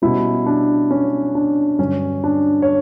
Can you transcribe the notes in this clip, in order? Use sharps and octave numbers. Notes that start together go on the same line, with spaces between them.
B2 G3 C#4 E4
D4
C#4
D4
G2 D3 F#3 C#4
D4
C#5